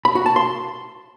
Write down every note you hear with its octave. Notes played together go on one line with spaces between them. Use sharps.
B5
F#4
A5
C6